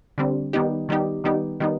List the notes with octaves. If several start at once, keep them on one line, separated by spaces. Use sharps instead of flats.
D3 G3 C4
D#3 G3 B3 D#4 G4
D#3 G3 B3 D#4 G4
D#3 G3 B3 D#4 G4
D#3 G3 B3 D#4